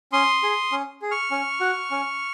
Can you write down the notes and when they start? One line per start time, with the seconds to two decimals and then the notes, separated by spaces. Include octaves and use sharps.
0.12 C#4 C6 D#6
0.43 G#4
0.72 C#4
1.02 G#4
1.11 C#6 F6
1.31 C#4
1.61 F#4
1.91 C#4